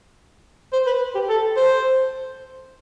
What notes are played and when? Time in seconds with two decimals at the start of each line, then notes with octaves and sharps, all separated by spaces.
0.73 C5
0.87 B4
1.15 G4
1.29 A4
1.57 C5